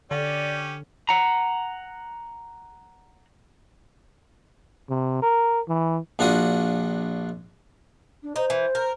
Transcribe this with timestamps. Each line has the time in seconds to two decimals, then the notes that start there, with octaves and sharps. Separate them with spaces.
0.11 D3 C#4 G4 D5
1.09 F#5 A#5
4.89 C3
5.22 A#4
5.68 E3
6.19 A#1 D4 F4 F#4 D#6
8.22 D4
8.36 D#4 C5
8.50 E3
8.75 A#4